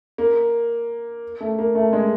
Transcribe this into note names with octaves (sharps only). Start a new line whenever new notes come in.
A#3
A3
A#3
A3
G#3